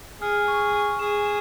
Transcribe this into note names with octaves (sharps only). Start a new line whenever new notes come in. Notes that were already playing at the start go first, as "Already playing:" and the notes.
G#4 F6
C#6
C#6
G#4 E7
E7